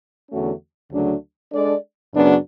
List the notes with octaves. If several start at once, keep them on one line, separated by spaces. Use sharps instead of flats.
E2 D3 A3 C#4 F#4
D2 C#3 F#3 A3 D4
G#3 D4 A4 D5
F#2 C#3 F#3 B3 D4